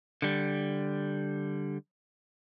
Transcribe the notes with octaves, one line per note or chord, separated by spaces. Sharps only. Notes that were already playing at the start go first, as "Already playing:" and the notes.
D3 G3